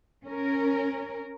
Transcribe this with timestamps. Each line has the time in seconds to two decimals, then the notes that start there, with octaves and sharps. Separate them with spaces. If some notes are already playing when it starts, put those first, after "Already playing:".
0.24 C#4 A#4